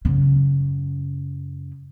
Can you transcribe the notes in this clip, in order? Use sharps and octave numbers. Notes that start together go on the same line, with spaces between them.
F#2 C#3